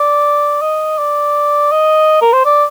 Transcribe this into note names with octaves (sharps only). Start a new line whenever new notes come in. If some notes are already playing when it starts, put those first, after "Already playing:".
Already playing: D5
D#5
D5
D#5
A#4
C5
D5